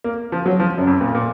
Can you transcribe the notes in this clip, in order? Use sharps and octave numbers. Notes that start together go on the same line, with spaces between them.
A#3
F3
F#3
F3
F#2
F2
A#2
A#2